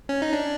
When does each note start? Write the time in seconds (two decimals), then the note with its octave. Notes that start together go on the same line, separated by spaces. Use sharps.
0.09 C#4
0.22 D#4
0.33 D4